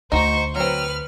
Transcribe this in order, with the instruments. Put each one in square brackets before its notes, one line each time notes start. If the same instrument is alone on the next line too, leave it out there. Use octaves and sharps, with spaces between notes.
[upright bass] D2 [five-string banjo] D#4 F#4 A#5 [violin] C5 C#6
[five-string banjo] F#3 C4 [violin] B4 F6